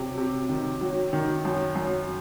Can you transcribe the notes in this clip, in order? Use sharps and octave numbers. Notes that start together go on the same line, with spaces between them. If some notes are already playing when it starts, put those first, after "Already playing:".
Already playing: C3 F#3
C3
D#3
F#3
D#3
F#2
F#2